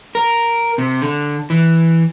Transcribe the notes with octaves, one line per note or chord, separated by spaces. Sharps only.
A#4
C3
D3
E3